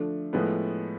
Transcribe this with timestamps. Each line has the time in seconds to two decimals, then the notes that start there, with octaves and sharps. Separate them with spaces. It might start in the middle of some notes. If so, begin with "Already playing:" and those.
Already playing: D3 F3 A3 D4
0.33 A2 F3 G#3 B3